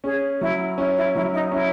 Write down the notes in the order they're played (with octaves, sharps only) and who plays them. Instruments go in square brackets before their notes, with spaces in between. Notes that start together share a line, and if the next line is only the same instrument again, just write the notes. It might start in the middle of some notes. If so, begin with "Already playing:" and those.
[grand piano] C#4 [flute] G#4
[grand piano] F#3 [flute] E4
[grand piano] C#4 [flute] E4
[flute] E4
[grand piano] F#3 [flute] E4
[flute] D#4
[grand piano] C#4 [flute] E4